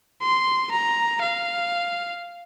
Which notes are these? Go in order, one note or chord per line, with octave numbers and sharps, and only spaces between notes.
C6
A#5
F5